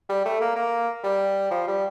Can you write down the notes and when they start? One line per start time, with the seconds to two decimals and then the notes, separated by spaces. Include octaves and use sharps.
0.09 G3
0.25 A3
0.41 A#3
0.56 A#3
1.04 G3
1.51 F3
1.68 G3